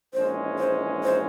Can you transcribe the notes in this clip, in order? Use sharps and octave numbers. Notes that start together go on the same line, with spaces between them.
A#1 G#2 E3 G#3 C#4 C5
C5
C5